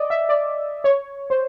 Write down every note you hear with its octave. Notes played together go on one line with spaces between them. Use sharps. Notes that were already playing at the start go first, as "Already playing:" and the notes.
Already playing: D5 D#5
E5
D5
C#5
C5